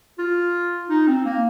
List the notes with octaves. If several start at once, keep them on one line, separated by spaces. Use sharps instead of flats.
F4
D#4
C4
A#3